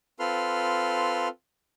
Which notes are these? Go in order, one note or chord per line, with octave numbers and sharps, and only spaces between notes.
C4 F4 A4 B4 C6 F6